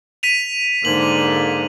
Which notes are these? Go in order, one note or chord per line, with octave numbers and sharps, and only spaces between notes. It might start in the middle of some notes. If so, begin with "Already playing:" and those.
B6 D#7 F7
G#2 D3 A#3 F#7